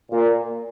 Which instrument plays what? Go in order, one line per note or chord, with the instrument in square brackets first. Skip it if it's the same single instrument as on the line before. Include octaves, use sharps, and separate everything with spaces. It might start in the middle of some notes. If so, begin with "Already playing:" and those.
[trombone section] A#2